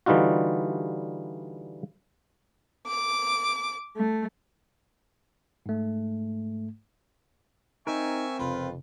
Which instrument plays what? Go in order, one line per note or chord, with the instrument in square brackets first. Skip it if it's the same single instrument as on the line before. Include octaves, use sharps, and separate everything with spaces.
[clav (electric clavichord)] D3 E3 G3 D#4 F4 F#4
[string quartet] D6
A3
[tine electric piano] G#2 A3
[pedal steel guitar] C4 A#4 [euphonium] D#4 [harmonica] E5 G#5 C#6
[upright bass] F1 C#3 [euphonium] F2 [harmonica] F4 B4